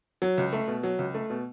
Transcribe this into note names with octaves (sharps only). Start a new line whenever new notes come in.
F#3
C#2
A3
B2
F#3
C#2
A3
B2